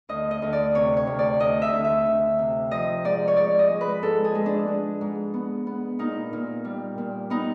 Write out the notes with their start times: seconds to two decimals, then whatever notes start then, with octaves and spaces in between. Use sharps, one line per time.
0.09 D2 D#5
0.31 D#5
0.42 D2
0.53 D5
0.75 C3 C#5
0.97 C#5
1.07 D2
1.19 D5
1.40 D2 D#5
1.62 E5
1.73 D2
1.84 E5
2.06 D2
2.39 C3
2.71 F3 D#5
3.05 G#2 D5
3.28 C#5
3.37 G#2 D5
3.59 D#5
3.70 G#3
3.81 B4
4.02 G#2 A4
4.24 G#4
4.35 G#3
4.46 D4
4.68 G#3
5.01 G#2
5.34 B3
5.67 B3
5.99 A#2 D#4
6.33 A#2
6.65 G3
6.98 A#2
7.30 B3 D#4